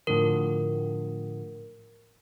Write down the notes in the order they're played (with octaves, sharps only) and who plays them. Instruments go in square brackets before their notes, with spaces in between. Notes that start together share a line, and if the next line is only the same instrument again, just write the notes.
[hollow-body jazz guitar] A2 D3 F3 [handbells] A#4